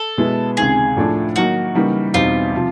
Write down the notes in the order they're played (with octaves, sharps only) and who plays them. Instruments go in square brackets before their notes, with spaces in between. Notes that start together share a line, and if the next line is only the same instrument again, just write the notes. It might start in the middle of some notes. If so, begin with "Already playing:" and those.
Already playing: [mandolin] A4
[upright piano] B2 G#3 B3 E4
[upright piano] C#2 C3 D#3 [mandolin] G#4
[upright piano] A2 F3 A3 D4
[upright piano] D#3 F#3 A#3 D#4 [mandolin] F#4
[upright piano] C#3 E3 G3 A#3 D#4
[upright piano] E2 B2 G3 C4 D#4 [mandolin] F4
[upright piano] C3 F3